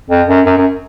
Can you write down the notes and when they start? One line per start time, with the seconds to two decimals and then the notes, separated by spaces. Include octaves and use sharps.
0.10 F2
0.28 F#2
0.46 F#2
0.58 F#2